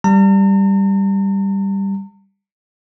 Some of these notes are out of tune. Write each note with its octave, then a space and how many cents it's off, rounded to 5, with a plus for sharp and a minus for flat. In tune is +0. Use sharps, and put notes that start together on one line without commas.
G3 +0 A#5 -45